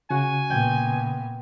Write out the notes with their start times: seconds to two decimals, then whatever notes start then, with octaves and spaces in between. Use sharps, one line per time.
0.11 C#3 F#4 G#5
0.50 A#2 B3 G5 G#6